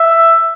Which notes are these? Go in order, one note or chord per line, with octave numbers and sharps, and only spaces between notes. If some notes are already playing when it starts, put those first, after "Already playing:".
Already playing: E5